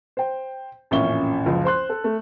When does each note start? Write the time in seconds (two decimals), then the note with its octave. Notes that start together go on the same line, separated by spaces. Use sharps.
0.17 C5 G5
0.91 A1 F2 A#2 C#4 E5 G7
1.46 F#1 C#2 F3 F4
1.65 C5 C6 F#6
1.90 A4
2.04 A3